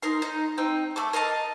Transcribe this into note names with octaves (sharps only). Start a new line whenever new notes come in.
D#4 A#4 C6
D#4
C4 D#4 G5
A3 A4 D6
A#4 D#5 F5 A5